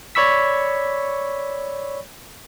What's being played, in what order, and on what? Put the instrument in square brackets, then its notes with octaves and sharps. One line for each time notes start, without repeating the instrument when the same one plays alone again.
[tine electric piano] C#5 D5 B5 C#6 E6 B6